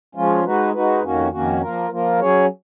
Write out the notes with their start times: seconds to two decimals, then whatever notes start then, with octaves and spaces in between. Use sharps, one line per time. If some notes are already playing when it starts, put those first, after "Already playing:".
0.15 F3 G#3 C#4 F4
0.44 G#3 D#4 F#4 B4
0.74 G#3 D#4 F#4 B4
1.03 F2 D#3 A#3 C#4 F#4
1.32 F2 D#3 A#3 C#4 F#4
1.61 F3 A#3 F4 A#4
1.90 F3 A#3 F4 A#4
2.20 F#3 C#4 G#4 C#5